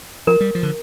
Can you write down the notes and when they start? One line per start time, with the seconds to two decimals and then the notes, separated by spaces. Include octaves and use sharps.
0.27 F3 A#4
0.40 G3
0.55 F3
0.63 D3